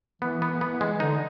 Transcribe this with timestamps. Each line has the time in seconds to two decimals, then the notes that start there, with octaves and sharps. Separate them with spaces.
0.22 E3 B3
0.42 B3
0.61 E3 B3
0.81 G#3
1.00 D3 D#4